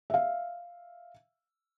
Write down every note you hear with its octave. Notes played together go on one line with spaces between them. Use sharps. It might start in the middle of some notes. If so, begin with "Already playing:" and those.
E5 F5